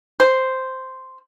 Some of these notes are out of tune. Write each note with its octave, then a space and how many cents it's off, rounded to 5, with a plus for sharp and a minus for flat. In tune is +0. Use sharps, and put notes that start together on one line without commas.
C5 -5